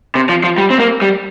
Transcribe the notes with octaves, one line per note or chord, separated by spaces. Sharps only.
C3
F3
F3
G3
C4
A#3
G3